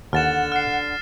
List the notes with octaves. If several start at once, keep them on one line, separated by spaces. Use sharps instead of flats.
D#2 D3 F#5 F6 A6 E7
F6 C7